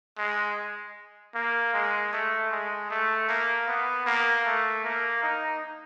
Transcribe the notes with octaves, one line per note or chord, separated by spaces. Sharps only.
G#3
A#3
G#3
A3
G#3
A3
A#3
B3
A#3
A3
A#3
D#4